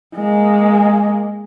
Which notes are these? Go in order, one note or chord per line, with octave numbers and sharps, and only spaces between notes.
G#3 A#3